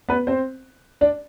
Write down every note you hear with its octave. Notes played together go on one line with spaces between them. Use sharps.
B3 B4
C4 C5
D4 D5